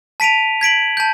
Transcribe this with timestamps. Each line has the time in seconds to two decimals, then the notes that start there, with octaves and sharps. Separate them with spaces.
0.20 A5 B6 D7 D#7 F7
0.61 G#6 B6 D7 F#7
0.97 A5 G6